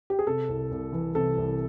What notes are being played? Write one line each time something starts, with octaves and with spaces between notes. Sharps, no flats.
G4
G#4
C3 A4
C2
C2
E3
C3 A4
C2